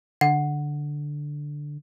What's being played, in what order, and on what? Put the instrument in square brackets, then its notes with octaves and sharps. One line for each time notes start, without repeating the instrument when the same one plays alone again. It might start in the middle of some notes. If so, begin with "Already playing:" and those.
[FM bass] D3 [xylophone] F#5